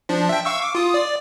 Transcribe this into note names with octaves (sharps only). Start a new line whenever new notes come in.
F3 D4
E5 G5
F5 C#6 E6
D6
F4 D#6
D5